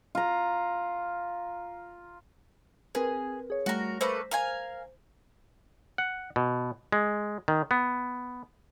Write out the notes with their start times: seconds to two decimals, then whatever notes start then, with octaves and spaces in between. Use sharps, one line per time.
0.15 F4 A#5
2.95 C4 G#4 A#4 B4
3.50 G#4 C#5
3.66 G3 A3 F#4 A#4 A#6
4.01 A3 A#3 B4 C5
4.31 A#4 F5 G#5
5.98 F#5
6.36 B2
6.92 G#3
7.48 D#3
7.71 B3